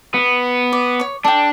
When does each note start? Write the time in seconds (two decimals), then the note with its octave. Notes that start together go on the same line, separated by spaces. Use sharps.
0.14 B3
0.73 D5
1.00 C#5 C#6
1.24 D4 A4 G5